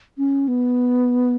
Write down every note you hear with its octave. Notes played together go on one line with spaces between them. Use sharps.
C#4
B3